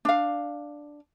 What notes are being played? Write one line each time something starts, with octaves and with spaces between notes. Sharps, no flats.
D4 F5